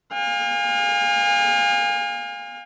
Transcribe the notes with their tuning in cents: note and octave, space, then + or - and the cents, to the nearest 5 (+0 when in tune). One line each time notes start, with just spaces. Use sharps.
F5 +25 G#5 -35